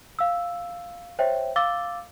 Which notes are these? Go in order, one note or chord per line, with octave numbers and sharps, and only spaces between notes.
F5 E6
C5 C#5 E5 G5
F5 D6 E6 A6 G7